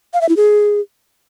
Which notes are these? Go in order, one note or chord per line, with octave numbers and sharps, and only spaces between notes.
F5
E5
E4
G#4